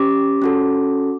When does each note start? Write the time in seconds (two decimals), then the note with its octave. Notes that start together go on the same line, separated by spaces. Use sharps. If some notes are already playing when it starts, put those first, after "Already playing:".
Already playing: C#4 G4 D6
0.42 C#4 F#4 A4